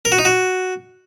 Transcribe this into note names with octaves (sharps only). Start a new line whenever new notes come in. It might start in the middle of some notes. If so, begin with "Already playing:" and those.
A#4
F#4
D#4
F#4